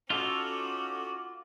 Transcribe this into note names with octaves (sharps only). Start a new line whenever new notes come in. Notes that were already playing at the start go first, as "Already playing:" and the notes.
C#4 D#4 F4 F#4 A4 C#5 D6